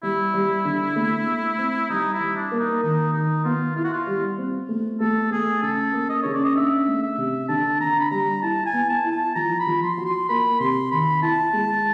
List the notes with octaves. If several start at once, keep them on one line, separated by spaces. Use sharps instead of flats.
G3 E4
G3
D3
A3
A3
C4
G3 D#4
E4
G3
D4
A#3
D#4
D#3 D#4
D#3 D#4
B3 F4
E4 F4
F#4
F4
G3
C4
A3
A3 A4
A3 G#4
C#3 A4
A#3
D#5
C#3 C#5
D5
D#5
D4 E5
A3
E5
C3
D3 A5
D3 A#5
B5
G3 A#5
E4 A5
G#5
B3
A5
E4
A5
F3 A#5
B5
F3
C6
F#4
C6
A#3 B5
C3 C6
D#3 B5
E4 A5
G#3